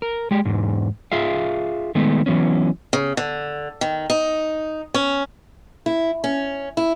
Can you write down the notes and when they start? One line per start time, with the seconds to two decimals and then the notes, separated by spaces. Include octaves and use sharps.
0.02 A#4
0.31 G#3 G4
0.45 E2 G#2
1.12 F4 G#4 E5 F5
1.95 D#3 G#3 A3 B3
2.26 E3 F#3 B3 C#4
2.93 C#3
3.17 D3
3.81 D#3
4.10 D#4
4.94 C#4
5.86 E4
6.24 C#4
6.77 E4